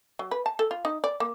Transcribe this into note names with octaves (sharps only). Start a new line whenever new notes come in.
F#3
B4
A5
A4
F4
D#4
D5
A#3